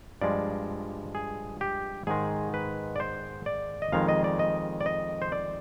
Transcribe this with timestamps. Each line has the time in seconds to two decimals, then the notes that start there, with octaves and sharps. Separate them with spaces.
0.21 G2 F3 G#3 D5
1.15 G#4
1.61 G4
2.07 G#2 D#3 G#3 G#4
2.54 B4
2.96 D5
3.00 C5
3.46 D5
3.82 D#5
3.92 F2 D#3 G#3 F5
4.08 D#5
4.24 D5
4.39 D#5
4.81 D5
4.86 D#5
5.22 C5
5.32 D5